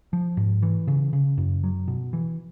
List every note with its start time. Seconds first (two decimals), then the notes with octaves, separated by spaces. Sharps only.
0.13 F3
0.37 G#2
0.62 E3
0.87 C#3
1.13 C#3
1.37 F#2
1.63 F#3
1.88 B2
2.13 E3